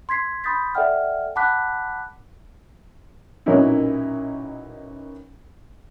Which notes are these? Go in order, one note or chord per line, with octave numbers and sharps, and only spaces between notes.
C6 G#6 B6 C7
B5 C6 D#6 G6 A6 B6
A4 D5 E5 F#5 G5 F6
F#5 A5 B5 D6 F#6 B6
B1 F#2 A#2 C#4 D#4 E4